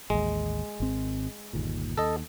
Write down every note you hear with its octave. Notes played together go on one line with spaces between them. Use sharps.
A1 D#2 G#3
G#1 C4
G1 D#2 A#2
D#2 A4 D#5